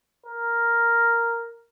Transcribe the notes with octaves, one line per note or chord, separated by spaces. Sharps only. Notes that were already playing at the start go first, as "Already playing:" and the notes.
A#4